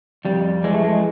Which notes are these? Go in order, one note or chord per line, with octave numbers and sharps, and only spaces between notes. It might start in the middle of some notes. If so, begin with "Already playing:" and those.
F2 G3
E3 G#3
A3
G#3